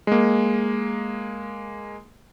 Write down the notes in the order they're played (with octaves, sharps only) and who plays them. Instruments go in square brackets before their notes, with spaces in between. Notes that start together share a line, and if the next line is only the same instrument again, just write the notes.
[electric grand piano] G#3 A#3